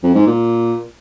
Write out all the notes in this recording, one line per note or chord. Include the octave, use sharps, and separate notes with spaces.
F2
G#2
A#2